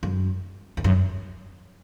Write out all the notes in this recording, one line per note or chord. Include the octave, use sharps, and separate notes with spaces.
F#2
E2
F#2